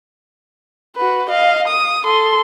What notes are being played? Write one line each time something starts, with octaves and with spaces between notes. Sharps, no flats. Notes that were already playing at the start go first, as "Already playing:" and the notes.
F#4 B4
D#5 F5
D#6
A4 C6